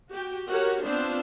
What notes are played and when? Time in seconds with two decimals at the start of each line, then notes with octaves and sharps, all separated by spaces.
0.11 F#4 G4 G5
0.50 F#4 G4 A#4 C#5 F#5
0.83 B3 C4 D4 F4 C5